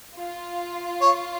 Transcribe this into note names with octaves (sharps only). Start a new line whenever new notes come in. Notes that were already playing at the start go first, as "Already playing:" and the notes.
F4
C#5